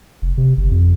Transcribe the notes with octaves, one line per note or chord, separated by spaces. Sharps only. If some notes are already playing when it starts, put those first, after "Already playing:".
F1
C3
G1
F2